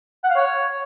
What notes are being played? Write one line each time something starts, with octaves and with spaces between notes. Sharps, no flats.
F#5
F5
C#5